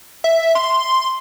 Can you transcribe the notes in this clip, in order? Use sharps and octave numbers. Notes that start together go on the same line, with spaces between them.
E5
C6